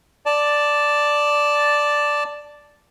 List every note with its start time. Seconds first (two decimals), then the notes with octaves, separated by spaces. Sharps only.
0.26 D5 A5